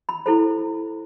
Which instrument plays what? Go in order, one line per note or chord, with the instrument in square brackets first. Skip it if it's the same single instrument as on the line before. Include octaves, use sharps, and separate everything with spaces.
[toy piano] B5
E4 A4 C5 B5